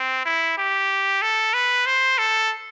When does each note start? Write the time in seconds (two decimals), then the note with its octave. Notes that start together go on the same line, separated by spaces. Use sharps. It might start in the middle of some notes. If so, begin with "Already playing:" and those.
Already playing: C4
0.25 E4
0.58 G4
1.22 A4
1.54 B4
1.86 C5
2.18 A4